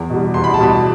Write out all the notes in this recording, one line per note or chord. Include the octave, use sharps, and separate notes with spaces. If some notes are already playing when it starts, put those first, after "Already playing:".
Already playing: E2
B2 G3
E2 C6
B5
A5
B2 G3 B5